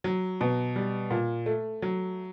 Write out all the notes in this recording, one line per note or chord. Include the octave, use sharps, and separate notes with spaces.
F#3
B2
G3
A#2
A3
F#3